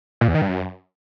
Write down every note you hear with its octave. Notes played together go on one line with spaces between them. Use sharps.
A#2
E2
D#3
G2
F#2